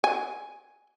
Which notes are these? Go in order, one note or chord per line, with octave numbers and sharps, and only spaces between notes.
G#5